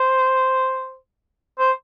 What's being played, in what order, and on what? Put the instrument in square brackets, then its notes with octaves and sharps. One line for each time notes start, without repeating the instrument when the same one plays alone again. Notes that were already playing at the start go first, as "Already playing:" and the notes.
Already playing: [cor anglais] C5
C5